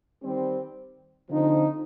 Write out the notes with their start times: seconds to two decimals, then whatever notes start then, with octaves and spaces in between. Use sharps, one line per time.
0.23 D#3 G3 C4
1.28 D3 F3 C4 D#4